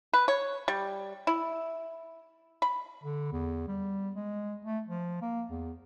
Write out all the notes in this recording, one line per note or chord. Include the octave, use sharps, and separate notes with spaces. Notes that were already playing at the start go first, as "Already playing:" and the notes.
B4
C#5
G3
E4
B5
D3
E2
G3
G#3
A3
F3
A#3
E2